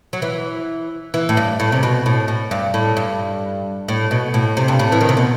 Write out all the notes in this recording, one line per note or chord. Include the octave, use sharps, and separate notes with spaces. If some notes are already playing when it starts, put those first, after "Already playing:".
F#3
E3
E3
A2
G2
A2
C3
B2
A2
A2
G2
A2
G2
A2
B2
A2
C3
G2
A2
E3
D#3
C3
B2